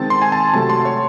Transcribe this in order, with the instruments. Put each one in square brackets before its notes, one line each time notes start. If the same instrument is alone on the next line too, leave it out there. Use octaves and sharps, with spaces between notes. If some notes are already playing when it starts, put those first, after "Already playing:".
Already playing: [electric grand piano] D#3 G#3 C4 A5
C6
G#5
A5
C3 F#3 A3 A5
C6
C#5